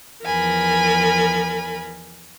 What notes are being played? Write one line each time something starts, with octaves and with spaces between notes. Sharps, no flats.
E2 F3 A#4 G#5 B5